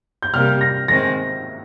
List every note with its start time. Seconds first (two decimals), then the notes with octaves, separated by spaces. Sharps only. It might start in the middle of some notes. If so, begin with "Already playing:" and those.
0.22 G6
0.34 C3 G3 A#3 F6
0.61 A#6
0.88 D#3 G#3 C4 A#6